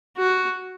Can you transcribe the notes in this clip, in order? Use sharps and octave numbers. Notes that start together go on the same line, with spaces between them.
F#4